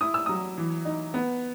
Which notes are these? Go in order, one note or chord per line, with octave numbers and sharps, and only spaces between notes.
E4 D#6
E6
F#3 D#6
E3
D#4
B3